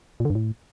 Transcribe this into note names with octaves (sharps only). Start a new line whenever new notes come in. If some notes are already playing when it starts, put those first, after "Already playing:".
A#2
D3
G2
A2